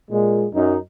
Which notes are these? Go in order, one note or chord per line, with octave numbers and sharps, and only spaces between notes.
A#2 G#3
F#2 D#4